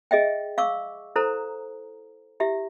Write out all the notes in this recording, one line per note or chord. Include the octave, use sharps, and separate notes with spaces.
G#4 D#5 E5 G5
F5 C#6 D6 E6
E4 A4 C5 A#5
E4 G4 E5